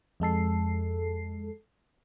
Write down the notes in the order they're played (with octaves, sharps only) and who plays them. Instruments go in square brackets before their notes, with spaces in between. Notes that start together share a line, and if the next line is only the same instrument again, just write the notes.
[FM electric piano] F2 G#3 A4 C7